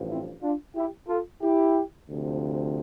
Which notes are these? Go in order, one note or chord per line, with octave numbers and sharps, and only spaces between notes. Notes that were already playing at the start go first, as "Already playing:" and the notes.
Already playing: A1 G2 F3
C4 E4
D4 F4
E4 G4
F4 A4
E4 G4
D2 C3 F3